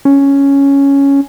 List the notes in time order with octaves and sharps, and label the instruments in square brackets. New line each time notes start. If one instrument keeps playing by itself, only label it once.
[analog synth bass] C#4